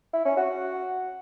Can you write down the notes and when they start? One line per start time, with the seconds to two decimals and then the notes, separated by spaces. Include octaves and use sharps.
0.13 E4
0.25 C#4
0.37 F#4